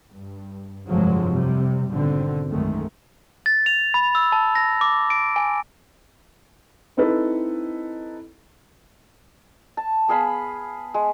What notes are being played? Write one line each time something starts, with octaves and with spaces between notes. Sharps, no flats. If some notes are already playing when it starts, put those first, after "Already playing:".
G2
F1 G2 D3 F3 F#3 G#3
C3 G3
G#1 B2 D3 C4
B1 F#2 D#3 G#3 A3
A6
F7
B5
E6
A5
A#6
D6
D7
G#5
C4 D#4 E4 A4 B4
A5
B3 G#4 F5 B5
G#3